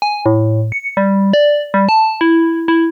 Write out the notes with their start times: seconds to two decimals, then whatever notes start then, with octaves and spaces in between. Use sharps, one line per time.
0.02 G#5
0.26 A2
0.72 C#7
0.97 G3
1.33 D5
1.74 G3
1.89 A5
2.21 E4
2.68 E4